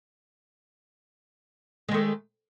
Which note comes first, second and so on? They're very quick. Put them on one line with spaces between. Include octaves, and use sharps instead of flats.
G#3 D#3 A3